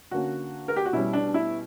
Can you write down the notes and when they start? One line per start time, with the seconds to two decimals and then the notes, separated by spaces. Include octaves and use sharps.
0.11 D3 A#3 C#4 F#4
0.68 A#4
0.76 G4
0.86 F#4
0.93 B2 G3 C#4 E4
1.13 D4
1.34 E4